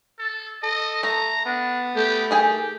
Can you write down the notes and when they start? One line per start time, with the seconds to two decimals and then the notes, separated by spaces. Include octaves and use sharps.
0.19 A4
0.63 A4 D#5
1.03 A3 A#5
1.46 B3 D4
1.96 A3 G4
2.31 D#3 G4 G#4 G#5